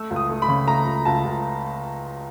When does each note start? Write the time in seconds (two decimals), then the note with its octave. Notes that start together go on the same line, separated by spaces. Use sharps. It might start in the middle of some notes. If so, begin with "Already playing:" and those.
Already playing: A3 E6
0.11 C#2
0.16 D#6
0.30 A3
0.42 B5
0.48 C#3
0.67 A3 A#5
0.86 C#2
1.05 C#2 A5
1.24 C#2